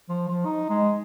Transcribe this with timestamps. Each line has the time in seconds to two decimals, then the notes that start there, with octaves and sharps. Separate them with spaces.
0.09 F3
0.28 F3
0.45 D#4
0.70 G#3